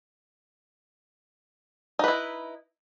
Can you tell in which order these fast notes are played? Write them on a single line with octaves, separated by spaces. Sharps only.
D#4 B4 E4